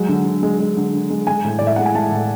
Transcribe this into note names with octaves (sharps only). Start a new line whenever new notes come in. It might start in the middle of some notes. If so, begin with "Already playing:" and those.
Already playing: F#3 G#3
D3
D3
G#3
G#3
D3
D3
G#3
G#3 G#5
A2
A2 D5
E5
G#3 F#5
G#5
G#3 A5
A2